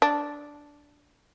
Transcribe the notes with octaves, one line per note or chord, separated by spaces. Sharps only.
D4